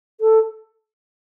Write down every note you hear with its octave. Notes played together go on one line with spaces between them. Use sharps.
A4